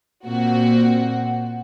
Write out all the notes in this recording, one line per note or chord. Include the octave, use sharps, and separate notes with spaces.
A#2 C4 F#4